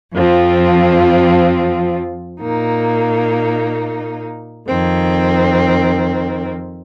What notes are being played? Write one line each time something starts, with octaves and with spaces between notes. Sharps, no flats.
F2 F3 C4 F4
A#2 A#3 D#4
F2 D#3 C4